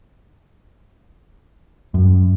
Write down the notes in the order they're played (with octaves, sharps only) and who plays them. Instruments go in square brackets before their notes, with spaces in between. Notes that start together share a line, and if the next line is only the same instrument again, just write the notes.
[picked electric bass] F#2